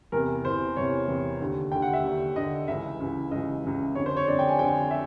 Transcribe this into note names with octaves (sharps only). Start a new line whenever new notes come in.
E2 C3 E3 A#4
E2 C3 E3 C5
E2 C3 E3 C#5
E2 C3 E3
D#2 D3
D#2 D3 G5
F#5
E5
D#2 D3
D#2 D3 D#5
C#2 C#3 E3 E5
C#2 C#3 E3
C#2 C#3 E3 D#5
C#2 C#3 E3
F2 D3 C#5
C5
C#5
F2 D3 D5
G5
G#5
F2 D3 G5
E5